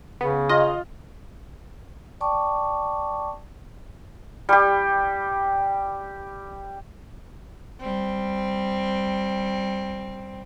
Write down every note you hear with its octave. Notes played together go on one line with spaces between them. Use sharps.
C#3 B3
F4 D#5
D5 G5 A5 C#6 D6
G3 G4
G3 C4